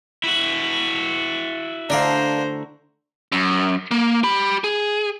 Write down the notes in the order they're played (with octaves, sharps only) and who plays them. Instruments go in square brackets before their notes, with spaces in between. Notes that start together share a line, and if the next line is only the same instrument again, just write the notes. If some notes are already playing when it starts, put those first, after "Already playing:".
[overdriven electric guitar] E4 F#4
[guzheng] D3 A3 [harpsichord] D4 D5 F5 [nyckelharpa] C5 A#5
[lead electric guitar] F#2
A#3
G4 B5
G#4